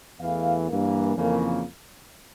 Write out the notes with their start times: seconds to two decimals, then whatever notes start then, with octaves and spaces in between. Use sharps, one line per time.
0.20 E2 E3 A3 F5
0.68 G2 E3 A#3
1.16 F2 C#3 E3 A#3